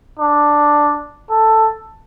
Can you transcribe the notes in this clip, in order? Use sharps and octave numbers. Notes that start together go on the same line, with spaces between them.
D4
A4